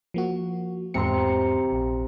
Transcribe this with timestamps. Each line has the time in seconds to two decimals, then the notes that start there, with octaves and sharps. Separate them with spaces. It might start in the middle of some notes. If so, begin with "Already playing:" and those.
0.14 F3 A#3 F#4
0.94 E2 G#2 C3 A#5 C6 C#7
1.73 A#1